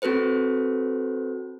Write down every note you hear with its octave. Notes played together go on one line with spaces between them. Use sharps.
C4 F#4 A4 B4 C5